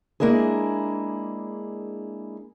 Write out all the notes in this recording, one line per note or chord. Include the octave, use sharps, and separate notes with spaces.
G#3 A#3 D4 E4 G#4